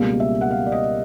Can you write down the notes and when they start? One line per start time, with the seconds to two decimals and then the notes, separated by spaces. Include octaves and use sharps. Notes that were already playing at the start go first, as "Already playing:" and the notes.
Already playing: C#2 B2 G3 A#3
0.20 E5
0.41 F#5
0.51 F5
0.66 D5
0.72 D#5